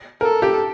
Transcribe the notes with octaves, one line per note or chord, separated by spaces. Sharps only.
A4 A#4
G4